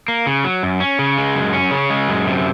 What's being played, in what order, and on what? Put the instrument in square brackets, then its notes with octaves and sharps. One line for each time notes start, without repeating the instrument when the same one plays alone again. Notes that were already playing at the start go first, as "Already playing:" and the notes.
[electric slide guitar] A#3
C#3
F#3
F#2
C#4
C#3
G#3
F#2
C#4
C#3
G#3
F#2
C3